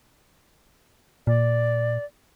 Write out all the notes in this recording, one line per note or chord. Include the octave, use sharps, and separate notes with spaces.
A#2 D5